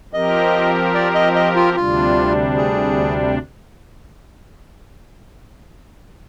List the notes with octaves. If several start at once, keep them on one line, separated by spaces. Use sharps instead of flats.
F3 C4 G4 A#4 D#5
D5
D#5
D#5
F4
D2 C3 G3 D4 F4
G#4